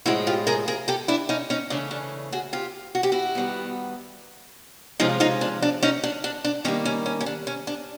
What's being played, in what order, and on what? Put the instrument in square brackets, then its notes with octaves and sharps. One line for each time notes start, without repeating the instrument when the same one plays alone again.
[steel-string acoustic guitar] A2 F3 G#3 E4 F#4
F4 G4
G#4 A#4
G#4 A#4
G4 A4
D4 E4
C#4 D#4
C#4 D#4
C#3 E3 A3 C#4 D4
D4
F#4 G#4
F4 G4
F#4
G4
E4 F#4
D#3 G3 B3
C3 F3 G#3 C#4 D#4 F4
D#4 F4
D4
D4
C#4 D#4
D4
D4
D4
D#3 G3 A#3 C#4
C#4
C#4
C#4
D4
C#4
D4